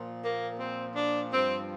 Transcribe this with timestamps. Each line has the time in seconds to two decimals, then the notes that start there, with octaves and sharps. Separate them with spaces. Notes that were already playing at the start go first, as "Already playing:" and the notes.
Already playing: A#2 F3
0.23 A#3
0.59 C4
0.96 D4
1.33 G2 F3 C4